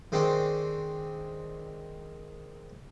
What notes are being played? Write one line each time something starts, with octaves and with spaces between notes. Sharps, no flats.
D#3 G#3 C4 D4 C#6